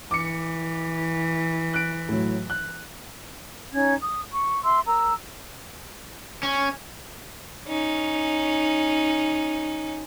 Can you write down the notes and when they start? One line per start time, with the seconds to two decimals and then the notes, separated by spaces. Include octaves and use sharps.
0.11 E3 D6 C#7
1.74 F#6 D7
2.09 A2 F#3
2.50 F#6
3.72 C#4 D#4 G#6
3.99 D#6
4.30 C#6
4.62 E5 C6 E6
4.86 A#4 A#5 E6
6.43 C#4
7.68 C#4 D#4